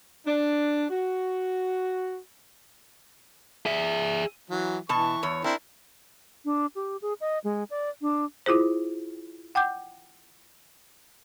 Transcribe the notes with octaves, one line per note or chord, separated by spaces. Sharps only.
D4
F#4
G#4 E5
E3 F#3
B2 E3 A5 C#6
E2 C#5
C4 D4 E4 A#4
D4
G4
G#4
D#5
G#3
D5
D4
E4 F4 G#4 C5
F#5 G5 D6 G6